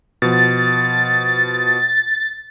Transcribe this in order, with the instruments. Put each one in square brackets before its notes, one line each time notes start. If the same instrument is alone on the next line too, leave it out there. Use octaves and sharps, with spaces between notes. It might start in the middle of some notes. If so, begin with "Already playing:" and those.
[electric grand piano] B2 F3 [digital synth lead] A6